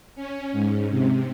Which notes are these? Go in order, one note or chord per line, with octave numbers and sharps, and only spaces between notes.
C#4
G#2
C3